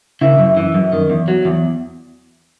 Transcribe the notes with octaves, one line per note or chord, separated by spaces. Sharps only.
C#3 E4
F#2
E3
F#2
D#3
E2
F#3
E2